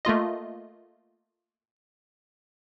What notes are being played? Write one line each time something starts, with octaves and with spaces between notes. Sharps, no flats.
A3 A#3 F4 D#5